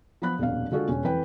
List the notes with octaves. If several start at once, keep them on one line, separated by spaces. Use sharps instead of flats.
F3 B3 B5 F#6
D#1 F2 B2 D4 F5
D3 G#3 F4 F#4 G#4 A4
E1 C#4
F2 E3 B4 G5